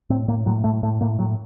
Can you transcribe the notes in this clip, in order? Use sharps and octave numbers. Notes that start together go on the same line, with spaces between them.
A2 C4
A2 A#3
A2 F#3
A2 A3
A2 A3
A2 A#3
A2 F#3